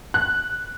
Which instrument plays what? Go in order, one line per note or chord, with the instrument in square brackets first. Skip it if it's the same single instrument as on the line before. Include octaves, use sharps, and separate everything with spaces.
[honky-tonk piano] F#6